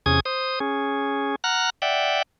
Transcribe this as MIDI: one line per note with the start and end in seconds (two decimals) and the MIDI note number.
0.06 0.20 40
0.06 0.20 48
0.06 0.20 61
0.06 0.20 68
0.06 0.20 87
0.06 0.20 92
0.25 0.59 72
0.25 0.59 87
0.60 1.35 61
0.60 1.35 68
1.44 1.70 78
1.44 1.70 82
1.44 1.70 89
1.44 1.70 90
1.82 2.22 74
1.82 2.22 76
1.82 2.22 78
1.82 2.22 79